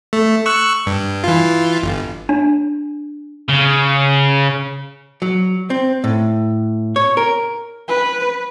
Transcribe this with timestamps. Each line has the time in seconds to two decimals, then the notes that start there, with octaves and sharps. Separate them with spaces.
0.13 A3
0.46 C#6 E6 F#6
0.86 G2
1.24 E3 F4
1.83 G1
2.29 D4
3.49 C#3
5.22 F#3
5.70 C4
6.04 A2
6.96 C#5
7.17 A#4
7.88 B4